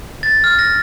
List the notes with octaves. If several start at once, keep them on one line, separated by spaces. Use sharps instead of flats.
A6
F6
A#6